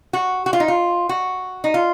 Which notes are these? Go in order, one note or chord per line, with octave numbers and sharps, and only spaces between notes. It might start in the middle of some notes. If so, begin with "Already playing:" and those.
F#4
F#4
F4
D#4
F4
F#4
D#4
F4